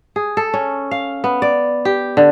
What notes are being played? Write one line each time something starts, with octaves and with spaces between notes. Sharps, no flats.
G#4
A4
C#4
F5
B3
D5
G4
D3